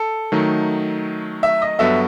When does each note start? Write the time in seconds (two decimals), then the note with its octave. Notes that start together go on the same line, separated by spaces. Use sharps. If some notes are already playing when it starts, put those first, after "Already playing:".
Already playing: A4
0.32 D#3 F#3 A3 D#4
1.43 E5
1.62 D#5
1.79 G2 F#3 B3 F#4 A4 E5